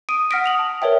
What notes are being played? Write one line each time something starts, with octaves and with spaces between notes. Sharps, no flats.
D#6 D7 D#7
F#5 F6 A#6 B6 D7
D#6 F7 F#7
A5
A#4 B4 C#5 D5 E5 G5